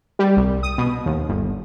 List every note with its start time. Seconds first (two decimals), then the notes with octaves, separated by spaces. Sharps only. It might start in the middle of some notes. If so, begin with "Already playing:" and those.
0.19 G3
0.37 C2
0.63 D#6
0.78 B2
1.06 D#2
1.29 G1